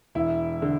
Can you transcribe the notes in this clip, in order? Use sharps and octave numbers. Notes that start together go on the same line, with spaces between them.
E1 E4
D3